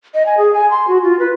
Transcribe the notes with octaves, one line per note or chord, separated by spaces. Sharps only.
D#5
G#5
G#4
G#5
C6
F#4
F4
B4